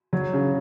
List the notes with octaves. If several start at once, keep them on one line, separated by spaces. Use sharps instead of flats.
F#3
C#3